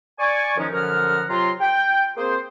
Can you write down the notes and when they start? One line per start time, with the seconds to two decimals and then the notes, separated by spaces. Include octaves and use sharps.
0.19 D5 G#5 C#6
0.57 F#2 D#3 F3 G#3 C#4 D#4
0.73 F#2 D3 F3 F#5 A#5 F6
1.29 C3 F#3 F4 A#5 C6
1.61 G5
2.17 A#3 C4 G#4 C5